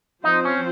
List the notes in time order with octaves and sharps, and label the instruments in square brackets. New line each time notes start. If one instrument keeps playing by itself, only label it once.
[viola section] F3 C4 F4 C5 [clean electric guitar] D#4
[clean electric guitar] C#4